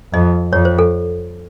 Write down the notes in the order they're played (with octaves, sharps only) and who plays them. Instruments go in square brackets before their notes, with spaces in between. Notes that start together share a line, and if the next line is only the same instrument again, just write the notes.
[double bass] F2 [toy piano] D#5
[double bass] F2 [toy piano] C#5
[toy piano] C5
A4